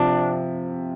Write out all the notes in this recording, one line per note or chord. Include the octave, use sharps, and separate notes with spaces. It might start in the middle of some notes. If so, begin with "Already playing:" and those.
Already playing: C3 F3 D4